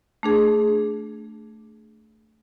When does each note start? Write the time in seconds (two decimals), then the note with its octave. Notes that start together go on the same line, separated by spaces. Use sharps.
0.23 A3 D4 G#4